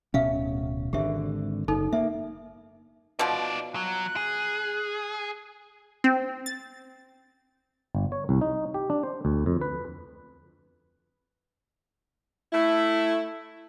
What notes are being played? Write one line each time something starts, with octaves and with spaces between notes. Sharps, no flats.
D1 B2 C#4 E5 F5
G#1 D3 G4 E5
F#1 D#4 A4
A#3 E5
B2 F3 D#4 D5
F#3 F#6
G#4
C4
A6
G1
C#5
C2
D#4
G4
D4
C5
D2
F2
B4
A3 E4